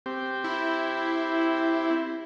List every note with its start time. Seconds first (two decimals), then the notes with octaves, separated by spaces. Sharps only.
0.06 C4 G4
0.44 E4